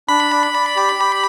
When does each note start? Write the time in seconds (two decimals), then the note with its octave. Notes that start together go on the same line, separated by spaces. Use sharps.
0.09 D4 B5
0.32 D5
0.54 D5
0.76 G4
0.99 G4